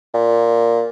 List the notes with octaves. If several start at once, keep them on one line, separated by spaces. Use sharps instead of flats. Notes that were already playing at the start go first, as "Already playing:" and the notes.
A#2